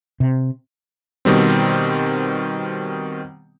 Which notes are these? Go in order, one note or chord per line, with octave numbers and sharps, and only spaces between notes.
C3
B2 D#3 G3 C4